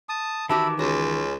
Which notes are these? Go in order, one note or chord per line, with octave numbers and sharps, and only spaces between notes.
A5 D#6
D#3 E3 F#4 G4 E5 A5 B5 D6
C#2 C#4 F#4